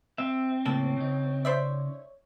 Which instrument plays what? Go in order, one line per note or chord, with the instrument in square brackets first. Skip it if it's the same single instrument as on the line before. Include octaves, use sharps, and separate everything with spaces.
[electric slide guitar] C4 [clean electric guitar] E5
[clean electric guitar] A2 C#3 A#3 [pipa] A4 [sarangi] C#5
[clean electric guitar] C#3 D#4
[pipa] C5 D5 E5